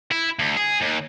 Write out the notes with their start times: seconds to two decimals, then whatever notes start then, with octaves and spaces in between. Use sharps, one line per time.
0.11 E4
0.39 D2
0.57 G#4
0.82 D#2